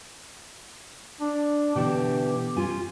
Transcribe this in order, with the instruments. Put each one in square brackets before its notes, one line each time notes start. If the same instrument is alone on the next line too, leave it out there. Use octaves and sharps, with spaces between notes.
[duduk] D4
[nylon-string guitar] B2 D3 E3 [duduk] G4
[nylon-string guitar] C#4 F4 G#5